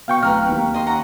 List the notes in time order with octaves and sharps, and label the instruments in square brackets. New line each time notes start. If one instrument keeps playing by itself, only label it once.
[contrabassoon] B2 [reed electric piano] F5 G5 C#6
[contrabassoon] D1 [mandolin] B4 A#5 F6
[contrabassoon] D#2
[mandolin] D#5 C6
C#4 F#5 A#5